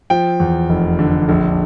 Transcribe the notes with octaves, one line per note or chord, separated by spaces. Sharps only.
F3 G5
E2
F1
D3
A#1